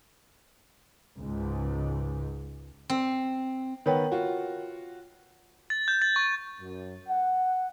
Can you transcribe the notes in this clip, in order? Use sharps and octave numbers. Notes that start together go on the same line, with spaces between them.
C#2 G#2
C4
D#3 B3 A#4 B4 C#5 G5
F4 F#4
A6
G6
A6
C#6
F#2
F#5